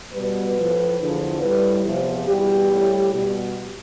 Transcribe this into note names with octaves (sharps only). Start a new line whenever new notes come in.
B2 G3 B4
A2 F3
E2 D3 F3
A2 G3 B4
E2 C3 F3
E2 B2 G3 G4
A2 G3
B2 G3